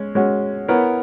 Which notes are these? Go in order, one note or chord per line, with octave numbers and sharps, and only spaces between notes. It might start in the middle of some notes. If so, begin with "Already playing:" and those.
Already playing: G#3 C#4
G#3 C#4 F#4
B3 E4 A#4 C#5